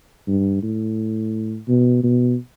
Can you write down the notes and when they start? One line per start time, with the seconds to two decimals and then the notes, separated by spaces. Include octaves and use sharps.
0.27 G2
0.63 A2
1.68 B2
2.03 B2